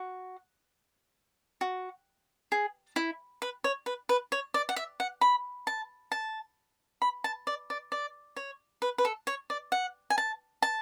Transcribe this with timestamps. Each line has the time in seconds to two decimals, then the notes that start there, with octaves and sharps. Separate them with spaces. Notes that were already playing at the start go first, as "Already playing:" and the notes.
Already playing: F#4
1.61 F#4
2.52 G#4
2.96 E4
3.42 B4
3.64 C#5
3.86 B4
4.09 B4
4.32 C#5
4.54 D5
4.69 F#5
4.76 E5
5.00 F#5
5.21 B5
5.67 A5
6.12 A5
7.02 B5
7.24 A5
7.47 D5
7.70 D5
7.92 D5
8.36 C#5
8.82 B4
8.98 B4
9.05 A4
9.27 C#5
9.50 D5
9.72 F#5
10.10 G#5
10.18 A5
10.62 A5